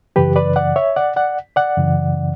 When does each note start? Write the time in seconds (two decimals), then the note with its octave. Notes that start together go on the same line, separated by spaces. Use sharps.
0.16 F#2 C#3 E3 G4 B4
0.36 B4 D5
0.56 D5 F#5
0.76 C#5 E5
0.96 D5 F#5
1.16 D5 F#5
1.56 D5 F#5
1.77 F#2 C#3 E3